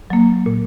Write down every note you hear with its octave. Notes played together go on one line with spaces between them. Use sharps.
F#3 A#3
A#2